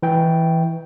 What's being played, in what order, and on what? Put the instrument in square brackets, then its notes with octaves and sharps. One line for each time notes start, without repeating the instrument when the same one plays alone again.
[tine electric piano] E3 G5